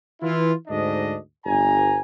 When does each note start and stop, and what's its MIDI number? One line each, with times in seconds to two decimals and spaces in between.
0.22 0.52 52
0.22 0.52 64
0.22 0.52 65
0.68 1.16 38
0.68 1.16 44
0.68 1.16 62
0.68 1.16 75
1.45 2.01 31
1.45 2.01 80
1.45 2.01 82